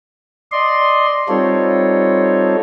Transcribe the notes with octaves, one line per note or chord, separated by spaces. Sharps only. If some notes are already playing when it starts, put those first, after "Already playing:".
D5 D#5 C6
G3 C4 D#4 F4 A4 C#5